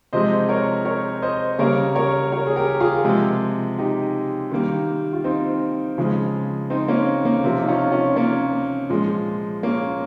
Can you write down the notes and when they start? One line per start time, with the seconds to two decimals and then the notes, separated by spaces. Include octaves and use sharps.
0.13 C3 F3 G#3 C5 D#5
0.49 A#4 C#5
0.85 A#4 C#5
1.22 C5 D#5
1.59 C#3 G3 A#3 A#4 C#5
1.95 A#4 C#5
2.32 A#4 C#5
2.47 G#4
2.56 G4 A#4
2.80 F4 G#4
3.05 C3 F3 G#3
3.78 D#4 G4
4.51 D#3 G3 A#3
5.13 F4
5.24 C4 D#4
5.98 C#3 F3 G#3
6.70 C4 D#4
6.88 A#3 C#4
7.25 A#3
7.44 C3 F3 A#3
7.62 D#4
7.68 C#4 F4
7.92 C#4 F4
8.16 A#3 C#4
8.89 A#2 F3 G#3
9.63 A#3 C#4